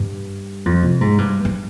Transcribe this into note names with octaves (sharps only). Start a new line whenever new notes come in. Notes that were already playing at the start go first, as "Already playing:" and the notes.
Already playing: G2
F2
C3
G#2
G2
G2